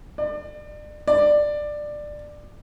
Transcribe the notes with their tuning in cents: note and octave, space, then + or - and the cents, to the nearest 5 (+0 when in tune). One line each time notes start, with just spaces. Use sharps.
D5 +35
D5 +15